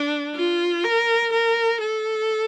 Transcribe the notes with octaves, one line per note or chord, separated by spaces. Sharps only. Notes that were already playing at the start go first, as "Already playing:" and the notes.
Already playing: D4
F4
A#4
A#4
A4